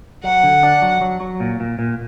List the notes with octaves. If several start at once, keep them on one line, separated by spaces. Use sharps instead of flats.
F#3 F#5
D3
D4
F#3
F#3
F#3
A#2
A#2
A#2